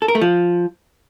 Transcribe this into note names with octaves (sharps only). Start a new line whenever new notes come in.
A4
A#4
A3
F3